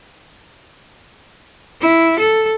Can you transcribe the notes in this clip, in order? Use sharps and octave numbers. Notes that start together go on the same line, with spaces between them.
E4
A4